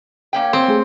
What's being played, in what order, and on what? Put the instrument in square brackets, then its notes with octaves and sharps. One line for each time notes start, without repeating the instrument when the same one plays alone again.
[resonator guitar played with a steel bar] A#3 C#4 G5
[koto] C4 [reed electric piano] C6
[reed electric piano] A3 G#4